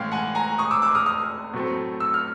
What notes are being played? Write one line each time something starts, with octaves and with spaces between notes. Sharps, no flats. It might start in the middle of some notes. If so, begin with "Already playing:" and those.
Already playing: A2 E3 G#3 C#4 F5 G5
F#5 G#5
G#5 A#5
C#6 D#6
D6 E6
D6 E6
D#6 F6
D#6 F6
A2 F#3 A3 C4
E6
F6